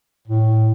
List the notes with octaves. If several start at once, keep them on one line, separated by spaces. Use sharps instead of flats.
A2